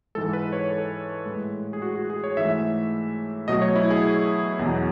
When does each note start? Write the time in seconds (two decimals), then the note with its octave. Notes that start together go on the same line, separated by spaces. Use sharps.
0.15 G#2 E3 G#3 A4
0.33 B4
0.52 C#5
0.70 A4
1.26 A2 G#3
1.73 G#4
1.82 F#4
1.95 F#4
2.10 G#4
2.24 C#5
2.37 G#2 E3 A3 E5
3.48 B2 F#3 A3 D#5
3.62 C#5
3.75 E4
3.90 G#4
4.59 E2 B2 F#3